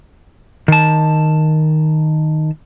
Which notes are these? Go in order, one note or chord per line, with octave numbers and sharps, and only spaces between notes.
D#3 A5